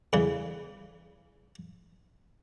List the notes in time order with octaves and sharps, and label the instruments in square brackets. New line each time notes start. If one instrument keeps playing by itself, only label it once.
[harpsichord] E2 C#3